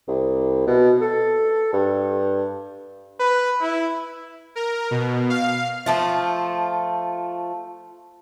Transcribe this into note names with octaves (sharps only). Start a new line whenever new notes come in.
C2
B2
A4
G2
B4
E4
A#4
B2
F5
F3 A3 F4